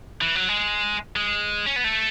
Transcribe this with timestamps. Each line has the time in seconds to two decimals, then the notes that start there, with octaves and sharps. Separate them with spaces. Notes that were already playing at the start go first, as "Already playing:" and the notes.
0.21 E3
0.35 F#3
0.49 G#3
1.16 G#3
1.66 C#4
1.76 B3
1.84 A3